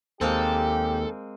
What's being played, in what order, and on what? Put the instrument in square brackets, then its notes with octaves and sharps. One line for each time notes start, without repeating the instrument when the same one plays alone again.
[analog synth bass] D#2 [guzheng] G#3 A#3 C4 [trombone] G4 [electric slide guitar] A4